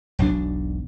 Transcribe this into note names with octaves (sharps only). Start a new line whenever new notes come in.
E1 B1 F#3 D4